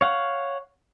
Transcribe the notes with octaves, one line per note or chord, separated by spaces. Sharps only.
C#5 F5 F#5